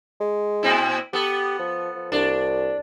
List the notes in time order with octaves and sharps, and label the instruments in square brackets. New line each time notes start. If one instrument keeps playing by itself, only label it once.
[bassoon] G#3
[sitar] A#2 C4 E4
[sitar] B3 A4 [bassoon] G4
[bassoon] F3
F3
[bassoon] C2 [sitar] D4